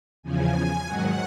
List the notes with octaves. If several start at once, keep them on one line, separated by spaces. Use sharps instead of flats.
E2 C#3 F3 G#5
G#5
G#2 D#3 F#3 F#5